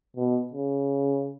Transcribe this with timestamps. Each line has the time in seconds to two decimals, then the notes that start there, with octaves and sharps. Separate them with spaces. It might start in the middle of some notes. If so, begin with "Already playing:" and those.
0.17 B2
0.53 C#3